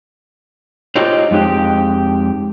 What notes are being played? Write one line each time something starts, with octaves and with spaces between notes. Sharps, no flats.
D#4 F4 G4 C5 C#5 D#5
F2 G#3 D#4 G4